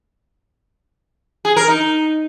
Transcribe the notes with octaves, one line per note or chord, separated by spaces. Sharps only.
G#4
A#4
D#4